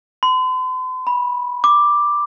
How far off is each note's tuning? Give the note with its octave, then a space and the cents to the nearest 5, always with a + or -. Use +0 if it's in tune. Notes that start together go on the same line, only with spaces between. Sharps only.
C6 -45
B5 -15
D6 +5